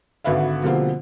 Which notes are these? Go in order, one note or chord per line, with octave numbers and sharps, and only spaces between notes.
G#1 D3 F#4 B4 E5 F5
B2 D3 F3 G3 A#3 C4